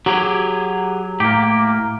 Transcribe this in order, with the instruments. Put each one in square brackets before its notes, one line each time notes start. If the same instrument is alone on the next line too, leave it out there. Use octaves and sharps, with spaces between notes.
[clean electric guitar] F#3 [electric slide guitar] G4 G#4
[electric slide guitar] A2 [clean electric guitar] A#3 G4